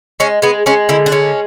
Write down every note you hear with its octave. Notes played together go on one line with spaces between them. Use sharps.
G#3 C#4
G#3 B3
G#3 C#4
D3 E4
D4
G#3 C#4